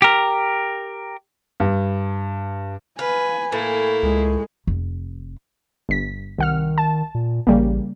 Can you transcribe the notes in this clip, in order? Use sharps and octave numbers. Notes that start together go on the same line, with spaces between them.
G4 A#4
G2
B4 F5 G#5
A2 A#3 E4
C#2 G#3
F1
G1 B6
C2 D#3 F#5 F6
A5
A#2
A1 C#3 G3 A#3